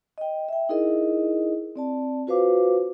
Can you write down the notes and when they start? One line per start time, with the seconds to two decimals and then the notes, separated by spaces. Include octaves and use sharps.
0.18 D#5 G5
0.48 E5 G5
0.69 D#4 E4 G#4 A#4 D#5
1.76 C4 D5 A5
2.27 F4 F#4 B4 C5 F5 D6